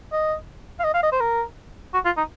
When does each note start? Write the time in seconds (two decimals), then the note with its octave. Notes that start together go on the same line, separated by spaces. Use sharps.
0.12 D#5
0.79 F5
0.84 D#5
0.94 F5
1.03 D#5
1.12 C5
1.20 A#4
1.94 F#4
2.05 F4
2.17 D#4